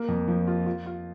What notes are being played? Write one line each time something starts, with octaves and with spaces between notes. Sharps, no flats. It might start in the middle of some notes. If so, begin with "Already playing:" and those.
Already playing: A#3
F2
F3
F4
F4
F4